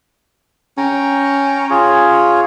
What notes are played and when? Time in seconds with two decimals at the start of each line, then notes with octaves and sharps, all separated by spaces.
0.78 C#4 G5 A#5
1.70 F4 G#4 C#5